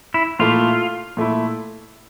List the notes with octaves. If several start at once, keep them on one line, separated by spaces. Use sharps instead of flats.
E4
A#2 A3 E4 F4
A#2 A3 E4